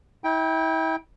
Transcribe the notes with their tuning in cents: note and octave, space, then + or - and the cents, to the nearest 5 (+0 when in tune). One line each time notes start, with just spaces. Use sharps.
E4 -35 G5 +0